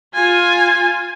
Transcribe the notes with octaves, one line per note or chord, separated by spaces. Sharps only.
F4 G#5